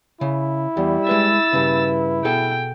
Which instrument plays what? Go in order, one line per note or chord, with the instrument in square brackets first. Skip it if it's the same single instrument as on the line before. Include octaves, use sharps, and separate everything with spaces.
[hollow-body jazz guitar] C#3 [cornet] E4
[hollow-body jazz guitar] E2 [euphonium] G3
[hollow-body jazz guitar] G#3 B4 E5 [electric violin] E6 A6
[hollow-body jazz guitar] G2 C#3 [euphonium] B4
[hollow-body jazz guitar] B2 G#4 A4 [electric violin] G5